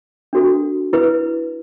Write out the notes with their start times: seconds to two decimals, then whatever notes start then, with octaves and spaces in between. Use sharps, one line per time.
0.33 D4 F#4 A4
0.93 E4 B4